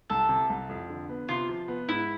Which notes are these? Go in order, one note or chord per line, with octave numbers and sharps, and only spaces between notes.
C2 A4
C3
C2
F2
D3
B3
C3 F4
F3
B3
G#2 E4